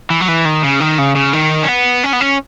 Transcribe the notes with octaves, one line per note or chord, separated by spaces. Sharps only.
E3
F#3
E3
D#3
C#3
D#3
C#3
C#3
D#3
C#4
B3
C#4
B3
C#4